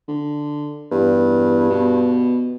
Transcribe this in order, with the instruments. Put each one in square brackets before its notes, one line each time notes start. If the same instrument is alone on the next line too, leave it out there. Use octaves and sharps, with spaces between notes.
[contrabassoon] D3
[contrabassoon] E2 [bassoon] G2
[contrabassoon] B2